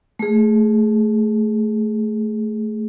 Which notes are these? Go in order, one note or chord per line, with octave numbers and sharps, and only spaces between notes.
A3 G#4